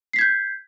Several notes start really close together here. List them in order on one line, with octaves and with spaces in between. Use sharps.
C7 B6 G#6 G6